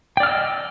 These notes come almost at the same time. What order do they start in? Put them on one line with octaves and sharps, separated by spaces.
G5 D5 F6 E6 D#5